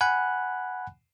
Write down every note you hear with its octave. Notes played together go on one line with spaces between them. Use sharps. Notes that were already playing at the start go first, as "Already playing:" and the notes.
F#5 G#5 B5 F#6